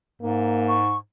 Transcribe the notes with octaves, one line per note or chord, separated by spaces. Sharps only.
G#2 A#3
C#6